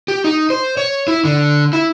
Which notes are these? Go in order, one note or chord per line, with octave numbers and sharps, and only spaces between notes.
G4
D#4
C5
C#5
E4
D3
E4